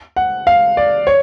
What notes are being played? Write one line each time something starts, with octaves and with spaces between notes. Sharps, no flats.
F#5
F5
D5
C#5